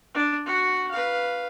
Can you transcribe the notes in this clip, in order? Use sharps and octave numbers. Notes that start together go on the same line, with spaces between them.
D4
F#4 F#5
B4 F5